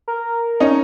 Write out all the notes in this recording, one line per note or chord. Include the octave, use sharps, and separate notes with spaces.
A#4
C#4 D#4